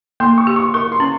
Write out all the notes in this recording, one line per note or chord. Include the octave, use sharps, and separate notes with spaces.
A#3 C6
C#6
G4
C#6
A#4 C#6
C6
C#4